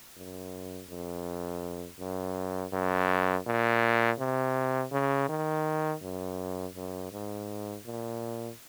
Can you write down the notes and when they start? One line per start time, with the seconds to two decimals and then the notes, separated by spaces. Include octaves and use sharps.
0.17 F#2
0.90 F2
2.00 F#2
2.73 F#2
3.46 A#2
4.19 C3
4.92 C#3
5.29 D#3
6.02 F#2
6.75 F#2
7.12 G#2
7.85 A#2